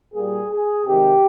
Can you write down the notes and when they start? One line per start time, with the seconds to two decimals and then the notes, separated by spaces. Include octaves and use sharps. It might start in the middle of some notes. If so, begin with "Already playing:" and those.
0.14 A#2 G3 A#3 G#4
0.51 G#4
0.86 C3 D#3 G#3 G4